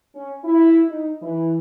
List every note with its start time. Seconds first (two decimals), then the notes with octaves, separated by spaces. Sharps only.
0.15 C#4
0.44 E4
0.88 D#4
1.22 E3